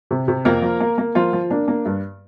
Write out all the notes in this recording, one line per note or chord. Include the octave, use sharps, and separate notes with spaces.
C3
C3
F2 A#3 A#4
F3
A#3
A#3
F3 A#3 F4
F3
A#3 D4
A#3
G2